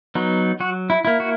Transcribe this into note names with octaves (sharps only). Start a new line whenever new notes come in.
F#3 B3 D#4
F#3 F#4
E4
A#3 E4
F#4